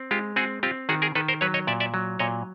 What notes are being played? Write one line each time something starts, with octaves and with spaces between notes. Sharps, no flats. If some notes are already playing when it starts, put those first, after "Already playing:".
Already playing: C4
G#3 F4 G4
C4 F#4 G#4
C4 F4 G4
D#3 F#4 G#4
G#4 A#4
D#3 A4 B4
A#4 C5
F#3 B4 C#5
C#5 D#5
A#2 D5 E5
D5 E5
F#3
A#2 C#5 D#5